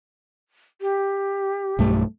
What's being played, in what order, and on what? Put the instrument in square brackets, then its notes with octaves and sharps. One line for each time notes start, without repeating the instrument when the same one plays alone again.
[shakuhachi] G4
[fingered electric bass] B1 G2 A3